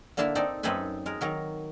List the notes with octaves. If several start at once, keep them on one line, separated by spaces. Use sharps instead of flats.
D3 A#3 D4 E4 A5
C4 D#4 A4 D5
F#2 C4 D#4 A4 B4 G#5
G#3 A#4
D#3 F#3 A#4